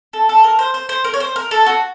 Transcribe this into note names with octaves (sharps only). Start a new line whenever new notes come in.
A4
A4
A#4
C5
C5
C5
A#4
C#5
C5
A#4
A4
F#4